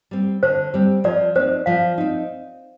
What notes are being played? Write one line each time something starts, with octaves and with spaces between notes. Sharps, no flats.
G3 C4
D3 C5
G3 C4
F3 D5
C4 D#4 C5
F3 F5
C4 D#4